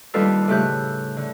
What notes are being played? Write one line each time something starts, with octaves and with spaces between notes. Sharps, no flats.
D#2 G3 D4 F4 A4 B4
A2 C#3 A3 G4 F#6 G6
D3